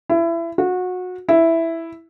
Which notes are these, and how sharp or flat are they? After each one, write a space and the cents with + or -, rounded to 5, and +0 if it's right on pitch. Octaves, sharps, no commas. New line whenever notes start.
E4 +25
F#4 -25
E4 +0